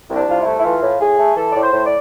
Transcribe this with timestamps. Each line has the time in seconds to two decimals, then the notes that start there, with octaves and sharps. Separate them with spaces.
0.09 C2
0.15 D4
0.28 C2 F4
0.39 E4
0.45 A3
0.57 E4
0.63 E3 F4
0.82 A2
1.00 A2 G#4
1.18 A3
1.36 E3 A4
1.50 A2 D5
1.60 C5
1.72 A2
1.85 D5